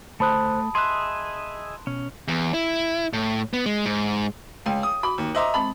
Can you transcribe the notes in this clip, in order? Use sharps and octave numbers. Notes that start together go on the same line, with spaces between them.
D2 A3 C5 A5 B5 D#6 F#6
G#4 D#5 E5 C6 F#6
B2 C#4
E2
E4
A2
B3
G#3
G#2
C#2 C#5 F5 G5
D#6
F#4 B5
D#2
C5 D#5 E5 A#5 C6 D6
G#3 C4 A5 B5